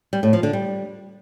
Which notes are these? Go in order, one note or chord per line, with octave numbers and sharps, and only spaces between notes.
G3
A2
F3
D3
G3